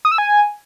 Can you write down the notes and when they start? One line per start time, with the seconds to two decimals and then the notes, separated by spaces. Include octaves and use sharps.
0.05 D#6
0.12 E6
0.18 G#5